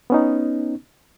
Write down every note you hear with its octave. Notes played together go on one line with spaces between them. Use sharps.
B3 C#4 D#4